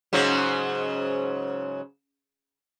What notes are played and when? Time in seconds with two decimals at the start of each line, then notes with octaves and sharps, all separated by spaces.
0.13 G#2 C#3 F#3